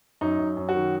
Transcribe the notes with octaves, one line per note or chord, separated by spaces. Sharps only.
F#2 D#4
F#2
F#2
F#4
D#3